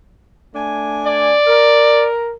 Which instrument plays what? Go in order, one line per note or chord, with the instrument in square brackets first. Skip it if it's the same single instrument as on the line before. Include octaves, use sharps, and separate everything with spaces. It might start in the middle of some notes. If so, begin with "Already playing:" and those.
[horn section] A3 D4 G#5
[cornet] D5
[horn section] A#4